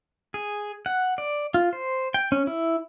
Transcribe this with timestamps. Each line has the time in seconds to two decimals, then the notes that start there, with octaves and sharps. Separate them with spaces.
0.34 G#4
0.86 F#5
1.18 D5
1.54 F4
1.73 C5
2.14 G5
2.32 C#4
2.47 E4